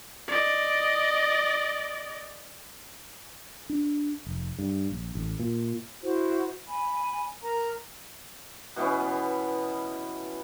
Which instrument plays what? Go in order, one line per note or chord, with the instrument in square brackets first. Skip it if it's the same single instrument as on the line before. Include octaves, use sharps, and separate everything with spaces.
[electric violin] D5 D#5
[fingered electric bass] D4
F1
G2
A#1
A1
A#2
[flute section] E4 F#4 C5
G#5 B5
A#4 A#5
[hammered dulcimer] B2 E3 B3 C#4